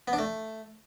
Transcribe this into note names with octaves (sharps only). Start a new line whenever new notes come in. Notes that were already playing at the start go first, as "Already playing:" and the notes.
B3
D4
A3